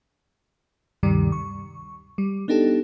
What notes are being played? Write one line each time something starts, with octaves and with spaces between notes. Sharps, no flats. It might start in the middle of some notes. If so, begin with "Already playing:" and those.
D2 G2 C3 D#3 G3
C#6
G3
B3 D4 D#4 G4 A4